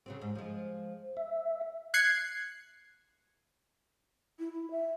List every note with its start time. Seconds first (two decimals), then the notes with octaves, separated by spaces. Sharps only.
0.06 C#3 F#3 C4
0.21 G#2
0.35 F3 G#3
1.17 E5
1.94 F#6 G#6 C7 C#7
4.38 E4
4.52 E4
4.70 E5